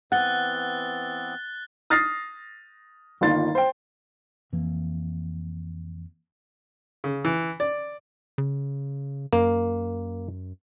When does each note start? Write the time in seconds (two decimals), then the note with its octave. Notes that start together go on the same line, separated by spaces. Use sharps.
0.12 E3 B3 C4 F#5 F#6 A6 G7
1.90 D#6 F6 A6 A#6 C7
3.21 G1 D#3 A#3 F4 C6 A6
3.55 C5 G5
4.52 F2 E3 A#3
7.04 C#3
7.24 E3
7.60 D5
8.38 C#3
9.33 F#2 A#3